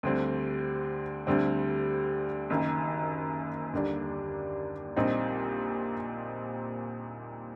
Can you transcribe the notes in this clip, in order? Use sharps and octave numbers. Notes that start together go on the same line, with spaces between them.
D2 D3 G3 C4
D2 D3 G3 C4
F#1 F#2 D#3
D#2 D3 G3 D4
A#1 A#2 G3 C4 D#4